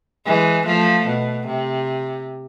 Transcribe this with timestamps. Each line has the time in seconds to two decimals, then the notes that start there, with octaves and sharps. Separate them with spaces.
0.26 E3 G#3
0.66 F3 A3
1.07 B2
1.47 C3